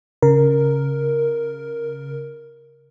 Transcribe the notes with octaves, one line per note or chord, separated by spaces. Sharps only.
C#3 A#4